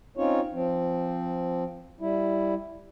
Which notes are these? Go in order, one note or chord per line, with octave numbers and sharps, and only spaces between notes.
C4 C#4 D#4 F4 C#5
F3 C4
G3 E4